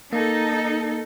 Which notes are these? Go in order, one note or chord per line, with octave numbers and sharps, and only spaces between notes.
A#3 D#4 A4